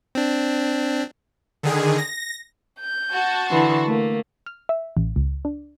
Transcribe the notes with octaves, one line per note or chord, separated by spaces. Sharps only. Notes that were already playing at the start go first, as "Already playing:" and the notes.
C4 D4
D3 D#3 G#4
A#6
G6
F#4 A5
D3 E3 C6
A3 A#3
F6
E5
A1
C#2
D4